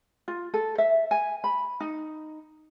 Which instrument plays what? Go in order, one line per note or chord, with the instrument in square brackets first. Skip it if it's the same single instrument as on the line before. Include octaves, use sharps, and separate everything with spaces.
[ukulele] F4
A4
E5
G#5
B5
D#4